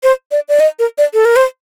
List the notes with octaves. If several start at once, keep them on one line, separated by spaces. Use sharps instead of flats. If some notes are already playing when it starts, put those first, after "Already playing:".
C5
D5
D5
D#5
A#4
D5
A4
A#4
C5